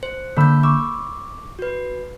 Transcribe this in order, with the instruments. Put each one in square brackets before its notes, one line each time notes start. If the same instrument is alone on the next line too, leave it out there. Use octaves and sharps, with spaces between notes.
[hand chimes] C5
[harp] D3 B5 E6 [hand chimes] A#3 G6
[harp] C#6 E6 [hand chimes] D6
[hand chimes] F#4 B4